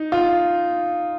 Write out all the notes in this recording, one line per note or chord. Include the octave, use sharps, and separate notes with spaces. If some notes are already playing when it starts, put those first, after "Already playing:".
Already playing: D#4
F4